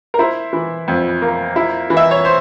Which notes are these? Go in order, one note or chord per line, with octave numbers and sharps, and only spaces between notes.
A#4
E4 C5
E3
F2
A#3
E4
E3
E5
C#5
C5